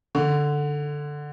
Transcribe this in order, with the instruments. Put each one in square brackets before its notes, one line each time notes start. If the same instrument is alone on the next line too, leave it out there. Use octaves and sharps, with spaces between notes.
[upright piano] D3